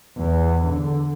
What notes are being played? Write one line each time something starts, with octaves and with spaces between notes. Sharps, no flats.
E2
D3